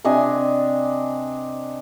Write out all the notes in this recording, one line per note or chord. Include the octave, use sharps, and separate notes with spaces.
C3 D4 D#5 G#5